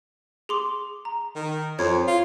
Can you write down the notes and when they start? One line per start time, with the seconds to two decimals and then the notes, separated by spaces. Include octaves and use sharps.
0.49 G#4 C6 D6
1.05 A#5
1.35 D#3
1.79 F2 C#5 G#6
2.07 F4